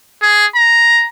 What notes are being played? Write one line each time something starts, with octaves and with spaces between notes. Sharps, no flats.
G#4
A#5